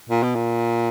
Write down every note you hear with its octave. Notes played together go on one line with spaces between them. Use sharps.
A#2
B2
A#2